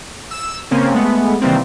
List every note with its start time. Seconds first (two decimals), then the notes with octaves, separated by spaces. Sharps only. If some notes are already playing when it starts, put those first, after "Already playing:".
0.31 E6
0.71 C#3 A#3 C4 C#4
0.94 G#3 A3 B3
1.41 C3 D#3 E3 G3 A#3 C4